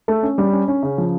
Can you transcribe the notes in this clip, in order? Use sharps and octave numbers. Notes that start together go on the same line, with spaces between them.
A3
C#4
G3
C#4
C#4
C#3
F3